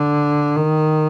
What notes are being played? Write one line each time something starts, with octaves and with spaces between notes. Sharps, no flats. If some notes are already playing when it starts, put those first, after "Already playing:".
Already playing: D3
D#3